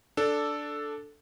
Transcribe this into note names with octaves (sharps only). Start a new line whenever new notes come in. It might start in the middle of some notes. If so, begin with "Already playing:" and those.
D4 A4